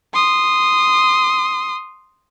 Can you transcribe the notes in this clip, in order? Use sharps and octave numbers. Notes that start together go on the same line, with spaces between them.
C6 D#6